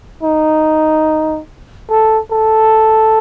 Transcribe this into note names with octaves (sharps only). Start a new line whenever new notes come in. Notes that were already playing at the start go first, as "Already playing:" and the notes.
D#4
A4
A4